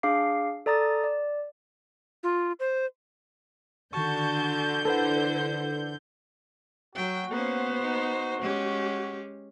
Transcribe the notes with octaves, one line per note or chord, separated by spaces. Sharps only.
D4 G#4 F5 D6 C7
A4 D5 A#5 D#6 A6
D5
F4
C5
D3 D#3 F#4 A5 C#6 G6
E4 A4 B4 C5 F#5
F#3 F#4 G5
A#3 B3 C#4 C5
D#4
G#3 C#4 G4